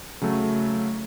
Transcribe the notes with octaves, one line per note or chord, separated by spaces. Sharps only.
C#3 F#3 A3